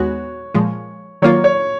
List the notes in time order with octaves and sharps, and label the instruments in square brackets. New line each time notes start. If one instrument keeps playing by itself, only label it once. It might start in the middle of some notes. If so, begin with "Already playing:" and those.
Already playing: [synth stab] D#2 G#3 B3 F#4 [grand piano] C#5
[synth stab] A#2 F3 G#3
[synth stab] D#3 F#3 A#3 F4 [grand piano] C#5
[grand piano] C#5